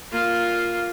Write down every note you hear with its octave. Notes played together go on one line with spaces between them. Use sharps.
A#3 F4